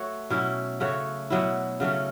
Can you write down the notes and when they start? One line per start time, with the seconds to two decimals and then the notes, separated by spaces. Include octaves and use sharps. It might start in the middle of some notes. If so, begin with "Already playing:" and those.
Already playing: A3 F#4 C#5
0.30 B2 F#3 C#4 E4
0.80 C#3 A3 F#4 C#5
1.30 B2 F#3 B3 E4
1.80 C#3 F#3 A3 C#4